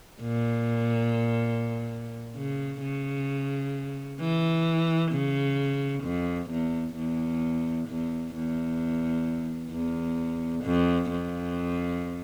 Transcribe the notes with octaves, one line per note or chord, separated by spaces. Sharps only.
A#2
C#3
C#3
E3
C#3
F2
E2
E2
E2
E2
E2
F2
F2